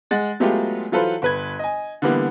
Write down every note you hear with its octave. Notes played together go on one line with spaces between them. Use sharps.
G#3 F#5 A6
F#3 G#3 A3 B3 F4 G4
E3 F#3 F4 A4 B4 C5
G1 B4 G#6
D#5 G#5
D3 E3 G3 A#3 B3 E4